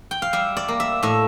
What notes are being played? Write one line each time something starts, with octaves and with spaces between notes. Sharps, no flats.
G5
F5
G3 E5
D5
A#3
E5
A2 E5